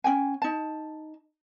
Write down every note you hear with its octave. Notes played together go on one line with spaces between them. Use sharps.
C#4 D#4 G5 G#5
D#4 A5